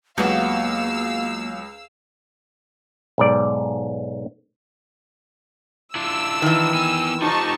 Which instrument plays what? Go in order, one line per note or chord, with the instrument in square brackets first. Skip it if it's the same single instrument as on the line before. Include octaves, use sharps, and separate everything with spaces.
[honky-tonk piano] C#2 [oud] F#3 B3 G4 [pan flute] A#3 [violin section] F5 E6
[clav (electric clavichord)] B1 G#2 D5
[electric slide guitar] D4 E4 F4 [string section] E6
[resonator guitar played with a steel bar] D#3 E3
[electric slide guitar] B3 G#5
[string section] D#4 A5 C#6 [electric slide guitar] F4 G4 C5